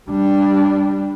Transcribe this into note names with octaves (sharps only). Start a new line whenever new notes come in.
G3 D4